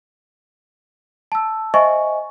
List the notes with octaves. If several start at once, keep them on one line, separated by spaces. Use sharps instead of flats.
A5 E6
C5 D#5 E5 G#5 C#6